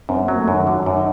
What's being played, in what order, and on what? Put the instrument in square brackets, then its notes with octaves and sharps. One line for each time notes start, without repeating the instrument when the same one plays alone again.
[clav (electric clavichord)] F#2 [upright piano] C4
[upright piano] A#3
[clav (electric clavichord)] F#3
[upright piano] A3
[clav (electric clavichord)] F#2 [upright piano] D#3
[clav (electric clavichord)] D3 [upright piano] F#3
[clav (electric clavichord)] F#2
[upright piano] D#4